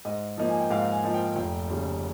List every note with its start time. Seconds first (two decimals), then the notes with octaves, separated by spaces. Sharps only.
0.05 G#2 D#5
0.38 F3 A#3 D#4
0.49 G#5
0.61 G5
0.71 G#2 F5
0.92 G#5
1.04 F3 A#3 D#4
1.14 G5
1.36 F1 G5
1.69 D#2 C#3 G3